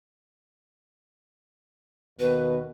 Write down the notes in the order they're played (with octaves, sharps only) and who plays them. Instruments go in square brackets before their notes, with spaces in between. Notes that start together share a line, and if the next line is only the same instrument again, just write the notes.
[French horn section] D#2 B2 D#3 [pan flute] B4